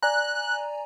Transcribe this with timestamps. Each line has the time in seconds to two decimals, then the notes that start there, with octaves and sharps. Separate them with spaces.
0.03 D5 G#5 A#5 F#6